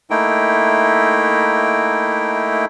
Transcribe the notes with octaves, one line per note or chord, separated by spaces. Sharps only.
A3 A#3 D#4 E4 G5